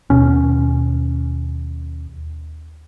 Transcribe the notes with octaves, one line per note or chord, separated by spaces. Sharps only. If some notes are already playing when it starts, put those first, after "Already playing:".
D#2 B2 C#4